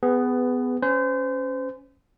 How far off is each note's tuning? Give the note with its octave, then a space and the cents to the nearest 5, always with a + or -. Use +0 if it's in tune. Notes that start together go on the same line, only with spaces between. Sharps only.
B3 +20 G#4 -10 B4 +10
C#4 +0 C5 -35